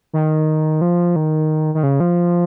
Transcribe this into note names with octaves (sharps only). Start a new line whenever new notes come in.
D#3
F3
D#3
D#3
C#3
F3